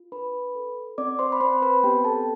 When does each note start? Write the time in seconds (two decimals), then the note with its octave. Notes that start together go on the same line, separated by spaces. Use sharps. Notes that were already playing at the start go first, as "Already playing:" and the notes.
Already playing: F4
0.12 D4 B4 B5
0.55 A4
0.98 C4 D5 D6
1.19 C5 C6
1.32 B5
1.41 C4 C5 C6
1.62 B4 B5
1.83 B3 G4 G5
2.05 A4 A5